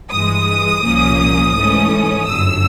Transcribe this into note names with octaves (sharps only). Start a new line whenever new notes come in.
G2 E3 G#3 D#6
C2 A#2 F3 A#3 C#4
G#2 E3 A3 C#4
G1 F#2 D3 E6